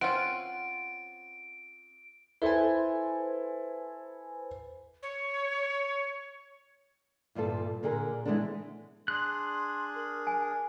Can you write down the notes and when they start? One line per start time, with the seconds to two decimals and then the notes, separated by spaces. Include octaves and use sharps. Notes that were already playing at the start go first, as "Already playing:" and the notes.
0.01 C4 C#4 F4 F#5 D7
2.42 E4 A4 B4 C5 G#5
5.03 C#5
7.35 D2 G2 A#2 F4 A4
7.83 A#2 D3 G#4 A#4
8.25 E3 F3 G#3 A3 B3 D4
9.08 D4 G#4 C6 F#6
9.95 A#4
10.27 G#5